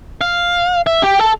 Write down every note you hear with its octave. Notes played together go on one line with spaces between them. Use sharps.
F5
E5
G4
A4